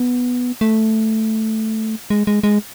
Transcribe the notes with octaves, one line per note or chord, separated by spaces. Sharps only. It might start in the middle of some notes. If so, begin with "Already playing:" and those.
Already playing: B3
A3
G#3
G#3
G#3